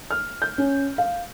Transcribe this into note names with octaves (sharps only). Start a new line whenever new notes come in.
F6
G6
C#4
F5